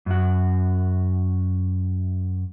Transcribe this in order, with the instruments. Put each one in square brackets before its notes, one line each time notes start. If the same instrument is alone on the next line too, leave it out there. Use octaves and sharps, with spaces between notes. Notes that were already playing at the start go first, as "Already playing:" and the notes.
[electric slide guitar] F#2 F#4